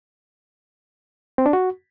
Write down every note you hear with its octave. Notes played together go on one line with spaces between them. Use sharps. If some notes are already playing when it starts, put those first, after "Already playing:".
C4
D4
F#4